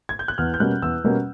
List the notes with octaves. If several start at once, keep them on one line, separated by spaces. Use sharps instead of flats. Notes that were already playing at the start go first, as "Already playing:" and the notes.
G#6
G6
F#6
E2 F6
G6
B2 G3 A#3 C#4 F#6
E2 E6
B2 G3 A#3 C#4